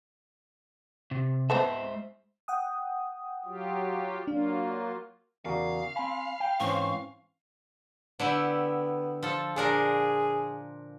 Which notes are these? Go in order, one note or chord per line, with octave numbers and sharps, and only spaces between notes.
C3
G#3 B3 C4 A4 C5 E5
F#5 G5 D#6
F#3 F4 G4
F#3 A#3 D4 F4
E2 C#3 F#4 A#4 D5 F5
C4 G#5 B5
G5
G#2 E3 C4 C#4 C5 C#6
D3 B3 E4 G4
F3 A4
A#2 D4 G#4 A#4